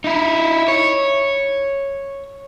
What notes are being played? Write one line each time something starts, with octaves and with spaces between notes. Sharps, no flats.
D#4 E4
C#5